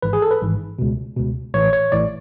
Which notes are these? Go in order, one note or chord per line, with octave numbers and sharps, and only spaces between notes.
G#1 G#2 E3 B4
G#4
A4
B4
G#1 G#2 E3
C#2 B2
C#2 B2
A1 A2 E3 C#5
C#5
A1 A2 E3 D5